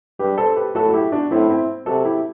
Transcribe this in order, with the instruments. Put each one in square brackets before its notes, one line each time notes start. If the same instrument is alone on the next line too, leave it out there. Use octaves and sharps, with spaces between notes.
[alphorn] G2 [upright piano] G4 B4
[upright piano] A4 C5
G4 B4
[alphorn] A2 [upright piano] F#4 A4
[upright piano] F#4
E4 G4
D4 F#4
[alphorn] A2 [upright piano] C4 E4
[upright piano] C4 E4
[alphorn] C3 [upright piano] F#4 A4
[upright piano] E4 G4